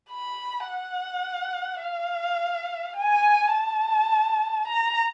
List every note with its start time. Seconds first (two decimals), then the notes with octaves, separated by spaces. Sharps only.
0.10 B5
0.68 F#5
1.82 F5
2.97 G#5
3.54 A5
4.67 A#5